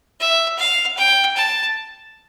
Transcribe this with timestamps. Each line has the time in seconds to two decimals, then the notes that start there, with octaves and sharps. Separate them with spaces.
0.20 E5
0.58 F5
0.97 G5
1.36 A5